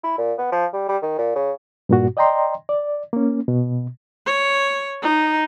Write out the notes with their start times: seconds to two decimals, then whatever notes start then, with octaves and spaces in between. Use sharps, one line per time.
0.04 E4
0.18 A#2
0.38 B3
0.52 F3
0.73 G3
0.89 G3
1.02 D#3
1.18 A#2
1.35 C#3
1.89 G2 A#2 F#4
2.17 D5 D#5 G5 A#5 C6
2.69 D5
3.13 A#3 C#4
3.48 B2
4.26 C#5
5.03 D#4